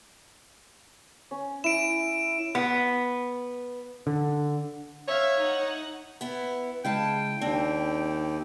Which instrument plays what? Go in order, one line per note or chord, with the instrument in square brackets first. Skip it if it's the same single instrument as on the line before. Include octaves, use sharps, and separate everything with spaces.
[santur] C#4
[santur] E4 [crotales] D7 E7
[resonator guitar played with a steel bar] B3
[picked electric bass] D3
[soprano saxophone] C#5 [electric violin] E5 F5
[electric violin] D#4 F#5
[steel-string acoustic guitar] B3 E4
[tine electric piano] C#3 G#3 [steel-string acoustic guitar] E4 F5 A5 [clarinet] G5
[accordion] D#2 [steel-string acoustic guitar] C4 [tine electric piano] D4